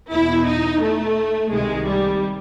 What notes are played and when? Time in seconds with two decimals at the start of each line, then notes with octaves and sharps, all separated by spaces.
0.11 E2 B2 E4
0.46 D#4
0.81 A3
1.51 C2 C3 D#3 G#3
1.86 G3